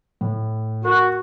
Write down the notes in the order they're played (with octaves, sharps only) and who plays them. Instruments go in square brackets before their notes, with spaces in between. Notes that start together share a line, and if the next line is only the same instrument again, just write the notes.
[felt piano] A2
[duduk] F#4 [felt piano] A#4